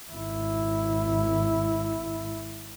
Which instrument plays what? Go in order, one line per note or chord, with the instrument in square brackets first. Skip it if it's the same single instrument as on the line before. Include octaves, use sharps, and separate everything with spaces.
[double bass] G#1 E4